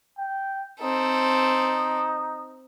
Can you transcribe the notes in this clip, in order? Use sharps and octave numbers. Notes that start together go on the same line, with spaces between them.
G5
C4 D#4 A4